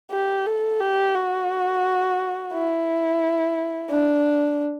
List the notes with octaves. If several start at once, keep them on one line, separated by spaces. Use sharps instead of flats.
G4
A4
G4
F#4
E4
D4